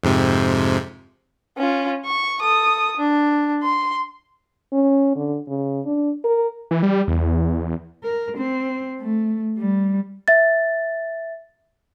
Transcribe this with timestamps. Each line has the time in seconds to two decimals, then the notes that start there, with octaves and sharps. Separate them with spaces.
0.04 F2 G#2 C3
1.57 C#4 F4
2.05 C#6
2.41 A4 D#6
2.97 D4
3.63 C6
4.73 C#4
5.16 D3
5.48 C#3
5.86 D4
6.24 A#4
6.71 E3
6.83 G3
7.08 E2
8.04 A#4
8.38 C4
9.00 A3
9.57 G3
10.28 E5 A6